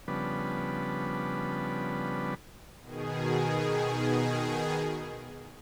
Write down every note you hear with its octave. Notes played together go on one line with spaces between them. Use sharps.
C#3 F3 G3 B3 D4 B4
B2 D#3 G#4